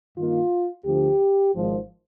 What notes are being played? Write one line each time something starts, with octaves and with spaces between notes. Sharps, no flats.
G2 D#3 A#3 D#4 F4
D2 D3 F3 G4
G#1 G#2 F3